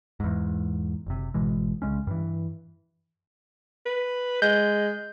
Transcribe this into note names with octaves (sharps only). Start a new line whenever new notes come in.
E2 G#2
F#1 C3
G#1 B2 E3 G#3
C2 C#3 G#3 C#4
G2 E3
B4
G#3 G6